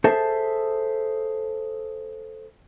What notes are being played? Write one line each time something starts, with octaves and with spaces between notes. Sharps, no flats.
G#4 A4 C5 E5 A5